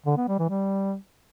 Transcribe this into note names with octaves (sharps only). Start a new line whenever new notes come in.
D3
B3
G3
E3
G3